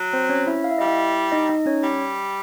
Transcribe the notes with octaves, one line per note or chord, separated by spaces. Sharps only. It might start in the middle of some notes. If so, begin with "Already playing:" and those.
Already playing: F#3
C4 C5
C#4 C#5
E4 E5
F5
E5
G3 D#5
E4 E5
D#4 D#5
D#4 D#5
C#4 C#5
G3